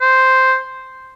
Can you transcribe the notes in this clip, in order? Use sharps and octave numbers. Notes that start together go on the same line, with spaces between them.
C5